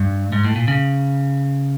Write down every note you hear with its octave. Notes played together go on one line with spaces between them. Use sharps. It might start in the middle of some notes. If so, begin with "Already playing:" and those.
Already playing: G2
G#2
A2
A#2
C#3